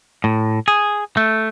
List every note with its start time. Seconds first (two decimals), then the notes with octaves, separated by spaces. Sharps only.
0.24 A2
0.68 G#4
1.17 A3